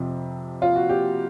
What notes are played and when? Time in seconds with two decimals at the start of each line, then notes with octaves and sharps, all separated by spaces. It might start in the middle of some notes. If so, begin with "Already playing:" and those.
Already playing: F2 C3 F3
0.62 F4
0.76 F#4
0.89 G4